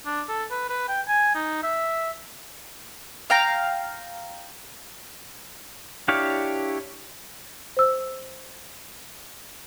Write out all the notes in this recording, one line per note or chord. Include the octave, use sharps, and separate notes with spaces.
D4
A4
B4
B4
G5
G#5
D#4
E5
F5 G5 A#5
D4 E4 G4 C#5 F5
C5 E6